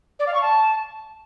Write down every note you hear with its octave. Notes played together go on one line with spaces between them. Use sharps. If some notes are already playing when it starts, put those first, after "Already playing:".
D5
F5
C#6
A5